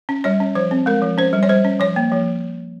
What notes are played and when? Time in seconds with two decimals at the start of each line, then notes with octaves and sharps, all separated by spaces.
0.09 C#4
0.24 G3 C#5
0.40 C#4
0.55 F3 C5
0.71 C4
0.86 G#3 A#4
1.02 F3
1.18 C#4 C5
1.33 G3
1.43 C#5
1.49 G3 C5
1.64 C#4
1.80 F3 C#5
1.96 A#3
2.12 F3